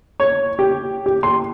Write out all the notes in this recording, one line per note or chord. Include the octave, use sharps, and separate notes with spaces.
C#5
G4
G4
C6